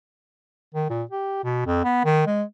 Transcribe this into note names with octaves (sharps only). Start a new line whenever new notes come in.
D#3
A#2
G4
B2
F2
B3
D#3
G#3